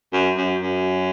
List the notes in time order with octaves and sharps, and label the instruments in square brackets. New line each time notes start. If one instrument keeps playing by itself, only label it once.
[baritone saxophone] F#2
F#2
F#2